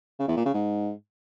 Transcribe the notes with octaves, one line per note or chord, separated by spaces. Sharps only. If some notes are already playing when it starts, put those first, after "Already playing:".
C#3
E2
A#2
C#3
G#2